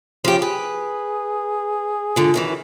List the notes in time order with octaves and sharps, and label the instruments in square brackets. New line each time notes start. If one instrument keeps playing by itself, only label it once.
[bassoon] C#3 [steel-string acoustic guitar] F3 G4
[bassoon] G#4 [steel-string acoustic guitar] B4
[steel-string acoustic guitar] G#2 D3 F3
F#2 D#3 E3